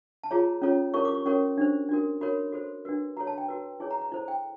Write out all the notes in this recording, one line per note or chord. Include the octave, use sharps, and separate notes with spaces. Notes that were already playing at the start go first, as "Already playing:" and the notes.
A5
F4 G#4 C#5 A#5
C#4 F4 A4 C#5
E4 G4 A#4 C#5 C#6
D6
C#6
C#4 F#4 A#4 C#5 C#6
D4 G4 C5
D4 F#4 A#4
F#4 A#4 C#5 B5
F#4 A4 C5
D4 F#4 B4
F#4 A4 C#5 A#5
A5
G5
F#4 B4
E4 G#4 C#5 G#5
A#5
A#5
E4 A4 C5
G5